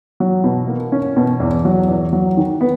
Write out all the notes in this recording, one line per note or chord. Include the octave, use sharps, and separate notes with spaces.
F#3
B2
A#3
C#4
B2
E2
F#3
E2
F#3
D#3
B3